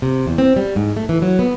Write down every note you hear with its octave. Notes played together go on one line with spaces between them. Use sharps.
C3
E2
C4
G3
G#2
A3
E3
F#3
B3